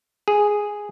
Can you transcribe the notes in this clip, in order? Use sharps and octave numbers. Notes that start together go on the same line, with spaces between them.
G#4